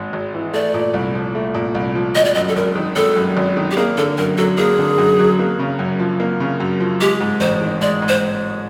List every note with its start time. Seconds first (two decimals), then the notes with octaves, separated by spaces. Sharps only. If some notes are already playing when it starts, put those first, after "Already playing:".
Already playing: G#1 G#2 G#3
0.13 G#1
0.34 E3
0.54 A3 D5
0.74 A#2
0.94 C2
1.15 F3
1.35 A3
1.55 A#2
1.75 C2
1.95 F3
2.15 G#1 D#5
2.25 D5
2.34 F#2 D#5
2.49 A4
2.56 G#1 A#4
2.76 D#3
2.96 G#1 A4
3.16 F#2
3.37 G#1
3.57 D#3
3.71 G4
3.77 A#3 G#4
3.98 D3 A4
4.18 F#2 A#4
4.38 F#3 A4
4.58 A#3 G#4
4.79 D3
4.98 F#2
5.19 F#3
5.39 A#3
5.59 C#3
5.79 F#2
6.00 F3
6.20 A#3
6.40 C#3
6.60 F#2
6.80 F3
7.01 G#3 G4
7.20 G#2
7.41 A1 C5
7.62 D#3
7.81 G#3 D5
8.02 G#2
8.08 C5